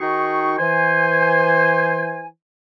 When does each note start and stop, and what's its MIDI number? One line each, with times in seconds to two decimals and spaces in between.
0.01 0.54 51
0.01 0.54 63
0.01 0.54 66
0.01 0.54 68
0.01 0.54 79
0.01 0.54 85
0.58 2.26 52
0.58 2.26 72
0.58 2.26 80